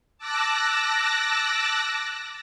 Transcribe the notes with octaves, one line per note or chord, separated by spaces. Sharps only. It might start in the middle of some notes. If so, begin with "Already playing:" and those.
A5 D6 E6 F#6 A#6